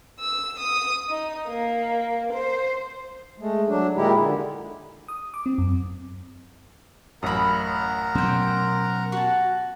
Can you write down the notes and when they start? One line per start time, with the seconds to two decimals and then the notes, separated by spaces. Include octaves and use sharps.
0.20 E6
0.60 D#6
1.09 D#4
1.48 A#3
2.33 C5
3.40 G#3 A3
3.68 F#3 D4
3.96 A#2 D#3 G#3 D#4 E4 G4
4.19 D3
5.08 D#6
5.34 D6
5.46 C4
5.58 F#2
7.23 A1 F#2 A#4 F#5 A#5 B5 D#6
8.15 B2 F#3 C#4 C5 G5
9.12 F#4 A5